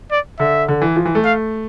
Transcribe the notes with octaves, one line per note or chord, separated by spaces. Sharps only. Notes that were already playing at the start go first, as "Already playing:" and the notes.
D5
D3 E5
D3
E3
F3
E3
A3
F5